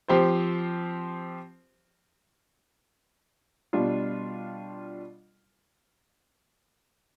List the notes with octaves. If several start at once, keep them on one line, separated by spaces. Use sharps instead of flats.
F3 C4 G4 C5
B2 G3 D4 F4